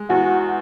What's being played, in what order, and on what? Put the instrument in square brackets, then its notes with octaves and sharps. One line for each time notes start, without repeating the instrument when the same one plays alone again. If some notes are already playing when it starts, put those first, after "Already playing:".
Already playing: [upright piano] G#3
[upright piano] E2 [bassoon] F#4